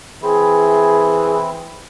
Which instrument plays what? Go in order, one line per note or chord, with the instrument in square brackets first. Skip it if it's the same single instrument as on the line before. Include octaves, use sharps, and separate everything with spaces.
[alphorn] E3 [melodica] C4 E4 [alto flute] G#4